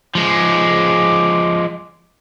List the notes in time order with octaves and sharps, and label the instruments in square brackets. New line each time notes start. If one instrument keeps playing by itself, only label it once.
[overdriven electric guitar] F3 G#3 [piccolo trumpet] D6